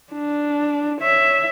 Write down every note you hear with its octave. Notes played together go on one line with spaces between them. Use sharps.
D4
C#5 E5